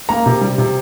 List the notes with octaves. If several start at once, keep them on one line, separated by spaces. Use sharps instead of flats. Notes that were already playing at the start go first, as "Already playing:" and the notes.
A#3 A#5
C3
G3
C3